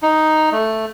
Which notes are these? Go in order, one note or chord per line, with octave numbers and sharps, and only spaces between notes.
D#4
A3